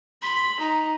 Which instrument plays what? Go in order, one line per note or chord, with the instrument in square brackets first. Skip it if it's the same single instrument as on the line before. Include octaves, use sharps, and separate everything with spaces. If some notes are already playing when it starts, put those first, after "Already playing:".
[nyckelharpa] B5 [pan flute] C6
[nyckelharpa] D#4 [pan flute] A#5